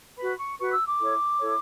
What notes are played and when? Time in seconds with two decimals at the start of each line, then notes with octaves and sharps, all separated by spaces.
0.17 F#4 B4 B5
0.37 C#6
0.58 F#4 B4 C#6
0.72 E6
0.85 D6
0.99 E4 A4 C#5
1.39 E4 A4 C#5